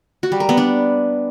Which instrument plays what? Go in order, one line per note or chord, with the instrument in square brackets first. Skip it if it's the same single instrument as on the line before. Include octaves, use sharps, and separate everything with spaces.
[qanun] F#4
G3
A#4
B3
D4